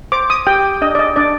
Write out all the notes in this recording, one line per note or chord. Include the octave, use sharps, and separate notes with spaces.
C5 D6
D#6
G4 G5
D4 D#5
D5
D#5
D4 D5